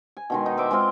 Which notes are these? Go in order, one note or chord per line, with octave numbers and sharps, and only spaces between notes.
G#5
B2 D#3 G#3
D#4
C5 E5 B5 D6
G#3 C4 F4